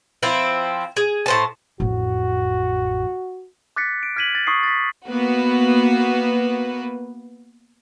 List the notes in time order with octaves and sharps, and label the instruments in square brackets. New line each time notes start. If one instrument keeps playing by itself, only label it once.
[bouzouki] F3 C4 E4
G#4
A2 C5 A5
[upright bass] A1 F2 [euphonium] F#4
[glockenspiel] D6 F#6 A6 B6 C#7
D7
F6 G#6 B6 D#7 F#7
A6
C#6 D#6 C7
A6 B6
[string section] A#3 B3 F#4 B4